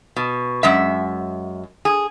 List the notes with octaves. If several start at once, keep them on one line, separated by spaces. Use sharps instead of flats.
B2
F#2 G#3 E5
G#4